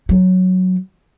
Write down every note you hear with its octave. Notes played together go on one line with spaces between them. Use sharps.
F#3